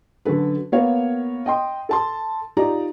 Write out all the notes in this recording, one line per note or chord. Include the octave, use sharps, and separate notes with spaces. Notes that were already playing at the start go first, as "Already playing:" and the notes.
D3 F#3 C#4 A4 B4
A#3 B3 F#4 A#4 C#5 F5
D#5 G5 C6
A4 A5 C6
D#4 F4 G4 D5 A#5